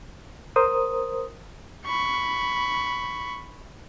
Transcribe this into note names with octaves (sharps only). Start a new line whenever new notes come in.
A#4 C5 D#6
B5 C#6